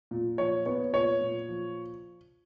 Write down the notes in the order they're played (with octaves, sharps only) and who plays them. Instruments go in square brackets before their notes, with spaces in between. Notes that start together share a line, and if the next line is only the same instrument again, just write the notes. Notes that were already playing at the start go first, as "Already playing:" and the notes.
[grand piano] A#2
F3 C#5
B3 C#5
A#2 C#5
A#2
F3